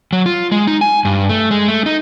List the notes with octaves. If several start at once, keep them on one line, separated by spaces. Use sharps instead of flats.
F#3
F4
G#3
D#4
G#5
G2
A3
G#3
A3
D#4